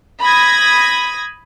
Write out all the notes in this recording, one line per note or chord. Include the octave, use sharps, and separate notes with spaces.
B5 D#6 G#6 A#6